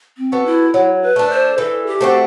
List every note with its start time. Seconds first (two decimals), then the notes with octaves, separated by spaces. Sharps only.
0.17 C4
0.32 B3 F#4 A4
0.46 E4
0.74 F#3 E4
1.02 B4
1.16 A3 D4
1.30 C5
1.58 E3 A4
1.87 G4
2.01 A3 C4 F#4